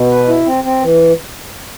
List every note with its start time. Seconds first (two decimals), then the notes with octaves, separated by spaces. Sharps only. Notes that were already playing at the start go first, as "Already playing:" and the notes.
Already playing: B2
0.10 B4
0.28 E4
0.47 C4
0.64 C4
0.82 E3